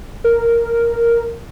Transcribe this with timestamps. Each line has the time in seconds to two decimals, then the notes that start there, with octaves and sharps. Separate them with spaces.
0.24 A#4